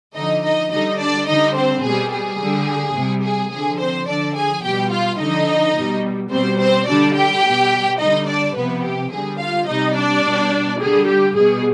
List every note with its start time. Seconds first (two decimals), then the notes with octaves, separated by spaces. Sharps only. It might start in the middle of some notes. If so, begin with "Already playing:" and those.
0.15 D3 F3 D#4 D#5
0.43 D#4 D#5
0.71 D3 G3 D#4 D#5
0.99 D4 D5
1.28 D3 G3 D#4 D#5
1.55 C4 C5
1.84 B2 G3 G#4
2.12 G#4
2.39 D3 G3
2.96 C3 G3
3.24 G#4
3.52 D3 F3 G#4
3.80 C4 C5
4.08 D3 F3 D4 D5
4.36 G#4 G#5
4.64 B2 G3 G4 G5
4.91 F4 F5
5.19 D3 F3 D#4 D#5
5.76 B2 G3
6.32 B2 G3 C4 C5
6.59 C4 C5
6.88 D3 G3 D4 D5
7.16 G4 G5
7.44 B2 G3
7.99 D3 G3 D#4 D#5
8.28 D4 D5
8.56 C3 F3 B3 B4
8.83 G4
9.11 D3 G3 G#4
9.40 F4 F5
9.68 C3 G3 D#4 D#5
9.96 D4 D5
10.24 B2 G3
10.80 D3 G3 G#4
11.08 G4
11.36 B2 G3 G#4